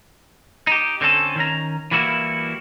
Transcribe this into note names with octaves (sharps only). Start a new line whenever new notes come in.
D#4 G4
D3 C4 C#4 A4
D#3 C#4 A#5
E3 G3 A#3 E4 F#4